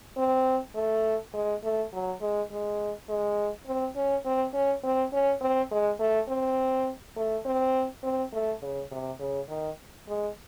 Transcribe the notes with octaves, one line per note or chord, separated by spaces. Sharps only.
C4
A3
G#3
A3
F#3
G#3
G#3
G#3
C4
C#4
C4
C#4
C4
C#4
C4
G#3
A3
C4
A3
C4
C4
A3
C#3
C3
C#3
D#3
G#3